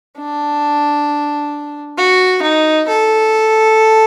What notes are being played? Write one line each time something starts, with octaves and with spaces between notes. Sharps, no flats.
D4
F#4
D#4
A4